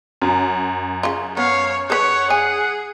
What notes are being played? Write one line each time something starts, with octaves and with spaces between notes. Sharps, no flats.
F#2
C#3 F4
B3 C#5 F5
G#4 B4 C#5 F#5
G#4 G#5